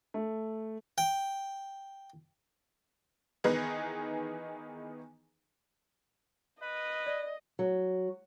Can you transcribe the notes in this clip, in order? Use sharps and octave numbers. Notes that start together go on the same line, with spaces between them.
A3
G5
D#3 E3 B3 D#4 G#4 B4
B4 D#5
D5
F#3